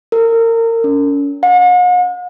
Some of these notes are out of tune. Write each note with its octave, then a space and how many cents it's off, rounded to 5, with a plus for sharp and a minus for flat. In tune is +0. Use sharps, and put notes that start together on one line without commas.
A#4 -30
C#4 +35
F#5 -45